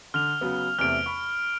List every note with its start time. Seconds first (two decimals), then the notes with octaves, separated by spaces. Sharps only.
0.14 D3 F6 F7
0.41 C#3 F#3 B3
0.79 E2 C3 A3 F6 D7
1.06 B5 C#6